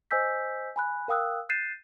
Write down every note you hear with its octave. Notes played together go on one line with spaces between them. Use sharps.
C5 D#5 G#5 E6 G6 B6
G#5 B5 F#6
A#4 F5 G5 D#6 E6 F#6
F#6 G6 A6 C7 D#7 E7